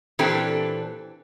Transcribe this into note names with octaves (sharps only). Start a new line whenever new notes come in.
A#2 E3 C4 D4 G4 A4